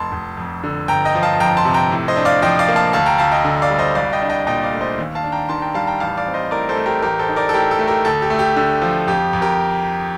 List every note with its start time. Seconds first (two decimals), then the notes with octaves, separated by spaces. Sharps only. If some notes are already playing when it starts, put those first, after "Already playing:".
Already playing: F1 A5 C6
0.12 F1
0.37 F2
0.64 D3
0.88 G1 G5 A#5
1.05 D#5 G5
1.15 F3
1.23 F5 A5
1.40 F2 G5 A#5
1.57 A5 C6
1.65 C3
1.74 G5 A#5
1.91 A2
2.08 C5 D#5
2.16 D4
2.25 D5 F5
2.42 F3 D#5 G5
2.59 D5 F5
2.68 A#3
2.76 F5 A5
2.93 D2 F5 A5
3.06 G5 A#5
3.18 D2 F5 A5
3.32 D#5 G5
3.45 D3
3.62 D5 F5
3.70 G3
3.78 C5 D#5
3.95 C2 D5 F5
4.13 D#5 G5
4.21 D4
4.29 D#5 G5
4.47 A#2 D#5 G5
4.63 D5 F5
4.73 A3
4.81 C5 D#5
4.98 D#2
5.15 F5 A5
5.24 D4
5.32 G5 A#5
5.49 D#3 A5 C6
5.62 G5 A#5
5.74 G3 F5 A5
5.87 G5 A#5
6.00 A1 F5 A5
6.17 D5 F5
6.26 C4
6.34 C5 D#5
6.51 A2 A#4 D5
6.69 A4 C5
6.77 A3
6.86 G4 A#4
7.02 A1 G4 A#4
7.19 A4 C5
7.29 D#4
7.36 A#4 D5
7.49 A4
7.54 A2 G4 A#4
7.71 A4
7.79 A3
7.88 G4 A#4
8.05 D2 A4
8.22 G4
8.30 A3
8.39 G4
8.57 D3
8.82 F3
9.07 F2 G4
9.33 F2
9.42 G4 A#4